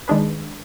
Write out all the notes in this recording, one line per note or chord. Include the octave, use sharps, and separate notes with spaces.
D#3 G#3 D4 G#4 B4